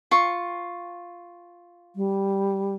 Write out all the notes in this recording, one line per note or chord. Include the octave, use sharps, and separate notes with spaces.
F4 C#6
G3